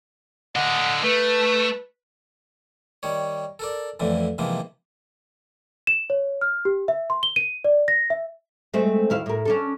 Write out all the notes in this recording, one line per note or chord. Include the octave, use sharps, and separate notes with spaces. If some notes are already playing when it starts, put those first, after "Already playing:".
D3 D#5 F#5
A3 B4
D#3 G3 C#5
A4 A#4 D5
F2 A2 D3 E3
G#2 C3 E3 F3 A#3
E7
C#5
F6
G4
E5
C6
G7
D#7
D5
A#6
E5
G#3 A3 C4
D#2 E4 F5
A2 A#4
C#4 D4 A4